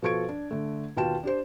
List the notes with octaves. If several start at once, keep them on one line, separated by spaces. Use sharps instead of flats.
B2 F3 A4 C#6 G#6 D7
D4
D3 A3
D#2 B2 F4 G5 A5 E7
D4 G4 C5